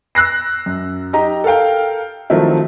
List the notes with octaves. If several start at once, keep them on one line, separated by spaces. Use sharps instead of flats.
E6 F#6 A#6 C7
F#2
D#4 G4 D#5 A#5
A4 A#4 F5 G5
D#3 F3 F#3 A3 C4 E4